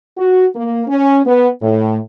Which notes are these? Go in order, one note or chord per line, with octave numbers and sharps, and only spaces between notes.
F#4
A#3
C#4
B3
A2